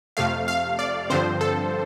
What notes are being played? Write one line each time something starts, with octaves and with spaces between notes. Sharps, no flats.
F2 C3 A3 F5
F5
D5
G2 D3 F3 C4 C5
A4